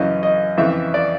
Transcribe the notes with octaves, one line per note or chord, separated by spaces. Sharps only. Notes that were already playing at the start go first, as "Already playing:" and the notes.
Already playing: F#2 C#3 E3 D#5
D#5
F2 C#3 E3 E5
D5